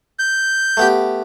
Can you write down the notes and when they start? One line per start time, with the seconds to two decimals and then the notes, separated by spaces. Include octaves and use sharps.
0.19 G6
0.77 A3 B3 G4